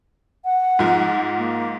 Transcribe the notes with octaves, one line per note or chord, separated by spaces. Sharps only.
F#5
G#2 F3
A#3